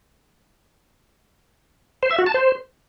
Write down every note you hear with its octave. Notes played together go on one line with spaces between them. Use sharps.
C5
E5
F#4
A5
C5